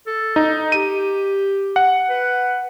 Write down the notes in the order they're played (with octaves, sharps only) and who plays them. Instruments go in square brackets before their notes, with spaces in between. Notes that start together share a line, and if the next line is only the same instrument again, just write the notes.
[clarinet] A4
[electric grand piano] D#4
[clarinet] G4 [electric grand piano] D#7
[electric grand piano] F#5
[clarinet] B4